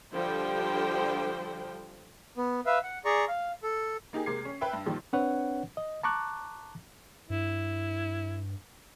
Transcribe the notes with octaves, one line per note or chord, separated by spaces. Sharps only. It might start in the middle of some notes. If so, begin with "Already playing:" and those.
D3 F3 G3 C5 G5
B3
B4 E5 F5
F#5
G#4 D5 A#5 C#6
F5
A4
A#3 D#4 G4 G#4
C3 G#3 A#3 D6 G#6 C7
C#4
B4 E5 G5 E6
G2
A#2 D#3 F3 G3
C4 D4 B4 C#5 F#5
D#5
A5 A#5 C#6 D6 F#6
G2 E4